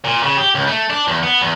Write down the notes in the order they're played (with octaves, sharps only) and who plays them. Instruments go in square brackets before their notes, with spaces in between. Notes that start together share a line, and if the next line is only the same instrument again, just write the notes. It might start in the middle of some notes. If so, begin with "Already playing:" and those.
[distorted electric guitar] A#2
C#3
G4
C#2
A3
D4
E2
B3
E2